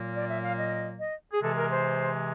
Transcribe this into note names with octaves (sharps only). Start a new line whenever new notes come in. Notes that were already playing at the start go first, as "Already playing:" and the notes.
Already playing: A#2 F#3 A#3
D5
E5
F5
D#5
D#5
G#4
C3 E3 G#3 A4
A#4
C5